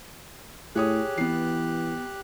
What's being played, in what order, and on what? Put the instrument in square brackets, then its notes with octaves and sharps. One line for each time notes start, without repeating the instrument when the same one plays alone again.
[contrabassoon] A2 [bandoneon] G4 F#6 [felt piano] G#4 C#5 D#6
[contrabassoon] E3 [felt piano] B3 C7